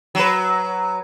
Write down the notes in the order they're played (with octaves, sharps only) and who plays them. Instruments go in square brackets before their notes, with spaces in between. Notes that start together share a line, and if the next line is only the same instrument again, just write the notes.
[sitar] F#3 B4